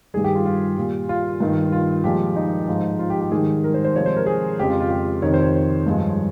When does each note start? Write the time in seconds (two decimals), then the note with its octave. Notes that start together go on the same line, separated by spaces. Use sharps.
0.14 G2 D#3 G3 G#4
0.24 G4
0.35 F4
0.46 F4
0.77 A#2 G3
1.09 F4
1.40 G2 D#3 G3
1.72 F4
2.04 A#2 F3 G#3 G4
2.36 D#4
2.68 G#2 F3 G#3
2.99 F4
3.10 G4
3.21 G4
3.31 G#2 D#3 G3 G#4
3.64 A#4
3.74 C5
3.84 C5
3.95 C3 F3 G#3 C#5
4.06 C5
4.16 A#4
4.27 G#4
4.59 F2 C#3 G#3 G4
4.70 F4
4.80 F4
4.91 G4
5.22 F2 C3 D#3 C#5
5.34 C5
5.43 C#5
5.86 G2 F3 G#3